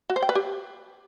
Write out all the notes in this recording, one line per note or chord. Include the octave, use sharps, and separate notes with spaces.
F#4
C5
G5
B4
G4